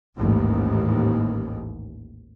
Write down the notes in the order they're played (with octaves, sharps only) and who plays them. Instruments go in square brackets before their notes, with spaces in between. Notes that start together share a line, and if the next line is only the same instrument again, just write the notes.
[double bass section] A1 D#2 G#2